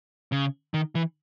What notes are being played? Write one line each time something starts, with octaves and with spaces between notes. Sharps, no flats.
C#3
D#3
E3